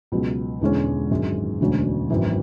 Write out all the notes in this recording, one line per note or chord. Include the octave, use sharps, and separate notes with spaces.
C#2 B2 F#3
E1 E2 D3 G#3 C#4
G#1 F#2 D3 G#3
E1 D2 D3 F#3 C#4
G#1 F#2 E3